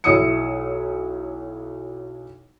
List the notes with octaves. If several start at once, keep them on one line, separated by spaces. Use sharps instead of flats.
B1 E4 C#5 D#6 E6 C#7